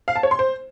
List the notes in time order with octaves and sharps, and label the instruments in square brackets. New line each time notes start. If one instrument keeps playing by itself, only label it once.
[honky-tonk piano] F5
A5
C#5
C6
C5